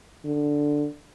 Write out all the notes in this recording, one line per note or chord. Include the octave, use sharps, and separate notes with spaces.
D3